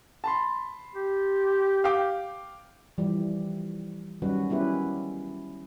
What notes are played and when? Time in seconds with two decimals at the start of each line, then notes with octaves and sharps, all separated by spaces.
0.24 A5 B5 C6
0.95 G4
1.84 F5 G5 D6
2.98 E3 F3 G3 G4
4.22 D#3 F#3 G3 C#4 F#4 B4
4.50 B3 C#4 E4 G4 B4